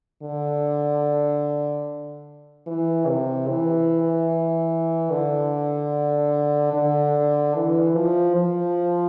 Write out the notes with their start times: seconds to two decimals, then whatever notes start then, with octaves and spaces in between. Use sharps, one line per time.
0.22 D3
2.67 E3
3.07 C3
3.48 E3
5.11 D3
6.73 D3
7.55 E3
7.95 F3
8.36 F3